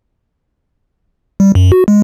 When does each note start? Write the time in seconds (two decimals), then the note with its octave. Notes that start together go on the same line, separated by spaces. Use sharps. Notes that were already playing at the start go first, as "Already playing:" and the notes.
1.40 G3
1.55 F#2
1.72 F#4
1.88 G#3